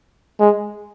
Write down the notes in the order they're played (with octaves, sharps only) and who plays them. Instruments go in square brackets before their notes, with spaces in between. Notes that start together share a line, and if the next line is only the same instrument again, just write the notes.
[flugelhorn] G#3